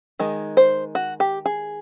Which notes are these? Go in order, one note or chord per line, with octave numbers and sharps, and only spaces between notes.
D#3 G#3
C5
F#4
G4
G#4